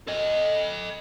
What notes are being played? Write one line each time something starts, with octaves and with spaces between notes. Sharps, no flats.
A4 D#5